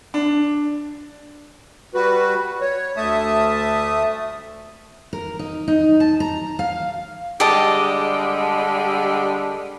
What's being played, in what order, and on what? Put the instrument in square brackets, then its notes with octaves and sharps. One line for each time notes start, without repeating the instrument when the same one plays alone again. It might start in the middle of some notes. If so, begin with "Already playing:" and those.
[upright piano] D4
[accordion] G3 F#4 B4
C#5
D2 A3 E5 A5 D#6
[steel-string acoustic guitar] A#4
D#4
D#4
A5
A#5
F5
[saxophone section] D3 G3 G#3 [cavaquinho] G4 D#5 A5